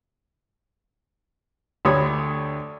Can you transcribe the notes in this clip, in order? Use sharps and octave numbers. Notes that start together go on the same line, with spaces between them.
D2 D3 G4 C#5 B5 D#6